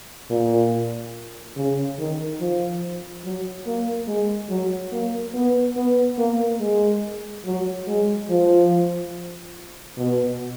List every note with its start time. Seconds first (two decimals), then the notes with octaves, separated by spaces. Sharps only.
0.30 A#2
1.56 C#3
1.99 D#3
2.40 F3
3.25 F#3
3.67 A#3
4.08 G#3
4.50 F#3
4.92 A#3
5.35 B3
5.76 B3
6.18 A#3
6.60 G#3
7.45 F#3
7.87 G#3
8.30 F3
9.97 B2